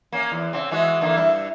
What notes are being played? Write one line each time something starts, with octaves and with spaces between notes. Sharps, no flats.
A#3 C#4
E2
C#3 C4
E3 G#3 F#4
D3 E3 A#3
G2 E4